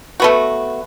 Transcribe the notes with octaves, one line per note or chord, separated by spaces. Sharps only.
A3 B3 F#4